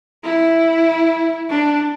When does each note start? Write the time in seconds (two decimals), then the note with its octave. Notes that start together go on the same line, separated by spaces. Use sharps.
0.24 E4
1.50 D4